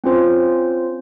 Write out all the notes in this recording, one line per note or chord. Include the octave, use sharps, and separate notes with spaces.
C4 C#4 F4 C5